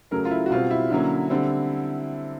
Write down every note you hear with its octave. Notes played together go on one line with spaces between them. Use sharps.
C#3 F#3 A3 C#4 A#4
F4
E4
F#4
B2 G3 C4 F4
E4
D3 F#3 A#3 C#4
D3 G3 C4